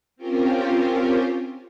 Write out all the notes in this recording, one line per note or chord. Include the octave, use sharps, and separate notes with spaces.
C4 C#4 F4 G4 A#4